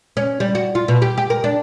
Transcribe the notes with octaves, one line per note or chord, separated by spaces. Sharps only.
C#4
G3
F#4
F4
B2
G4
G4
A#4
D4